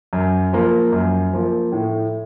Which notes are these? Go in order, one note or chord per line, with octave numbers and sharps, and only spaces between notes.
F#2
F3 A#3
F#2
F3 A#3
A2